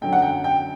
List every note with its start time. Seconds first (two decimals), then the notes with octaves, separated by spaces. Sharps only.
0.01 F#2 D3 F#3 G5
0.13 F#5
0.22 G5
0.44 G5